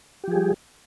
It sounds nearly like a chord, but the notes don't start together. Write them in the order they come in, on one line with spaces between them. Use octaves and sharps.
G4 F3 G#4 G3